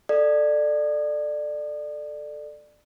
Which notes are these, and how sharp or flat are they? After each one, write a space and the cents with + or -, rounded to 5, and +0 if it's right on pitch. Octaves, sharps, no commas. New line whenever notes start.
A4 +0 D5 +20